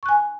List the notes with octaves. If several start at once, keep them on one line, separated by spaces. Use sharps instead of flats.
G#5 C#6 F#6